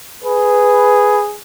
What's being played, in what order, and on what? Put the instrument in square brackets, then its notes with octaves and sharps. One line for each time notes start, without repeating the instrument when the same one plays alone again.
[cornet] G#4 [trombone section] B4